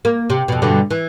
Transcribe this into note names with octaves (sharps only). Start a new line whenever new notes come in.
A#3
C3
F2 B2
G2 B2 D3
E3